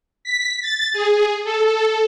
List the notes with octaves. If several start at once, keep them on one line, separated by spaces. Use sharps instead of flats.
B6
A6
G#4
A4